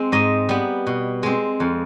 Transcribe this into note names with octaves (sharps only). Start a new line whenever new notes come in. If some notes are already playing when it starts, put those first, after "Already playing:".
Already playing: G#3 C4
G#2 D#5
G3 B3
B2
G#3 C4
F2